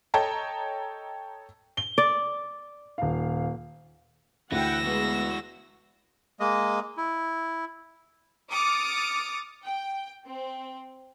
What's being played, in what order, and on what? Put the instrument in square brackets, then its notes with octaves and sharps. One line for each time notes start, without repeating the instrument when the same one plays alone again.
[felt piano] A4 C#5 D#5 G5 A5 A#5
[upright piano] G7
[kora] D5
[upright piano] D#1 F5
[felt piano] D2 [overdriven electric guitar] E3 [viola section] F#5 G5 [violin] E6 A#6
[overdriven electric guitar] E3 F#4 [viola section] G#3 B3
[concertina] G#3 A#3 D#5
E4
[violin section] D6 D#6 F6 A6 C#7
G5
C4